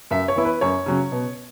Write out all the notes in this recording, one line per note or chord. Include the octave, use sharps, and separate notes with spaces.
F#2 E5
C#5
E3 B3 E4
B4
F#2 C#5
C#3 F#3 C#4
B2